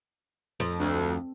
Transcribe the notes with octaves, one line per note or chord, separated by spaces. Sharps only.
F2
D2